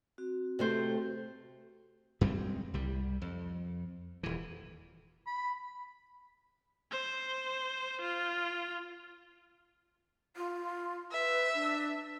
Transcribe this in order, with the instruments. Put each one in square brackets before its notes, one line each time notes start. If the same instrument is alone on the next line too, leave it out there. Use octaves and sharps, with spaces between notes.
[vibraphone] C4 F#4
[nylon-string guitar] C3 A3 C5
[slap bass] F#2 G3 G#3 C4
C2 G3
F2
D#1 E3
[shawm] B5
[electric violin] C5
F4
[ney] F4
[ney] B4 [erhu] E5
[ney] D4